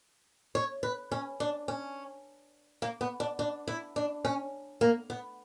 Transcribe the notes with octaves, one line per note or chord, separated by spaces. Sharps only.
C#5
B4
C#4
D4
C#4
A#3
B3
D4
D4
E4
D4
C#4
A#3
B3